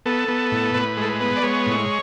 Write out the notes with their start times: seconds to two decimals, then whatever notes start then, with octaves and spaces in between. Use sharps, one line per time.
0.06 B3 A4
0.28 B3
0.52 A2
0.74 A2 B4
0.97 G#3 A4
1.09 B4
1.21 B3
1.36 D5
1.43 G#3 C#5
1.66 A2